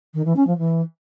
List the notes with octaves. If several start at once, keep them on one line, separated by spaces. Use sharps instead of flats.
D#3
E3
C#4
F3
E3